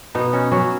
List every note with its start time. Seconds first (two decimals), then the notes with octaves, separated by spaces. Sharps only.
0.15 B2 B3 D#4
0.33 C#4 F#4
0.52 F#3 C#4 F#4